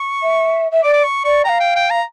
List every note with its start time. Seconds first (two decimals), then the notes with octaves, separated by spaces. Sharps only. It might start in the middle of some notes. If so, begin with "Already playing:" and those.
Already playing: C#6
0.22 E5
0.71 E5
0.83 D5 D6
0.93 D6
1.04 C#6
1.24 D5 C#6
1.44 G5 A#5
1.49 F5
1.60 G5
1.76 G5
1.91 A#5